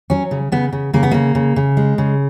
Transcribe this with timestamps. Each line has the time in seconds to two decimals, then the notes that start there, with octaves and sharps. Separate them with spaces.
0.10 F#3 C#4
0.31 C#3
0.52 C#3 B3
0.73 C#3
0.93 C#3 A#3
1.03 B3
1.11 C#3 A#3
1.35 C#3
1.56 C#3
1.77 G#3
1.98 C#3